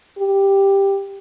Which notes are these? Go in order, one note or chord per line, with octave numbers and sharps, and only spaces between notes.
G4